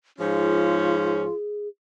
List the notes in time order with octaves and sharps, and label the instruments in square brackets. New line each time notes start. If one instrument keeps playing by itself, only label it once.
[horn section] G#2 F3 C#4 [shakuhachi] F4 [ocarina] G#4